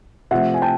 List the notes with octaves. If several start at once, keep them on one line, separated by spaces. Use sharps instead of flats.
C3 F3 A3 E5 F#5
G#5
G5 A5